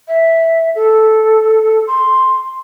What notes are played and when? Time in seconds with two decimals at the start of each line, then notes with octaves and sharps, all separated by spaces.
0.08 E5
0.75 A4
1.87 C6